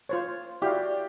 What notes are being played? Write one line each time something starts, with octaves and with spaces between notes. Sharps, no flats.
F4 C5 C#5
E4 F#4 G4 D5 F5